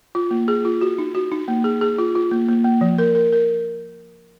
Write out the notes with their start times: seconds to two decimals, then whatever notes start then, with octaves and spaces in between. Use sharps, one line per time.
0.15 F4
0.31 A#3
0.48 G#4
0.65 F4
0.81 F#4
0.98 D#4
1.15 F#4
1.32 D#4
1.48 A#3
1.64 G#4
1.81 G#4
1.98 F4
2.15 F4
2.31 A#3
2.48 A#3
2.64 A#3
2.81 F3
2.98 A#4
3.15 A#4
3.32 A#4